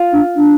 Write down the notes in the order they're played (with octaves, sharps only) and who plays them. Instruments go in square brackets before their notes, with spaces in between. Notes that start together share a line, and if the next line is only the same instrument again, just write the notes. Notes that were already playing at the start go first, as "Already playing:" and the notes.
Already playing: [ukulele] F4
[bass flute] D4
D4